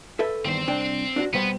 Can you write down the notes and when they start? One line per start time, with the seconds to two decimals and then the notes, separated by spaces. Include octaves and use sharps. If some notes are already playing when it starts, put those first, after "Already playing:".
0.19 A4 B4 E5
0.45 E2 G2 D#3 C4 C5
0.67 C2 D4 G5
1.16 D4 F4 F#4
1.34 B2 G3 B3 C5